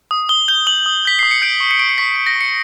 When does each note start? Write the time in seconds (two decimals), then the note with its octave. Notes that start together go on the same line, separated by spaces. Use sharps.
0.11 D#6
0.29 D#6 G7
0.48 G6 G7
0.67 D#6 F#7
0.86 D#6
1.05 G6 B6
1.19 D#6 C7
1.31 C#7
1.42 G6 D7
1.60 C#6
1.71 C#7
1.79 C#6 D7
1.89 C#7
1.98 C#6 B6
2.16 C#6 B6
2.26 A#6
2.35 C#6
2.41 C#7